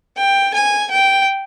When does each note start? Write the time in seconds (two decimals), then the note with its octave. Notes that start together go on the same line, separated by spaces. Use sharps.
0.17 G5
0.54 G#5
0.91 G5